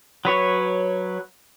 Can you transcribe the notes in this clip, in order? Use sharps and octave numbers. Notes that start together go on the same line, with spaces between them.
F#3 B4 C#5